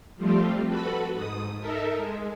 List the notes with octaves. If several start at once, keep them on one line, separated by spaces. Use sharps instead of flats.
F3 G3 A3 C4 F4 G4
F#4 A4 B4 B5
G#2 D#6
D#4 A4 A#4 E5
G#3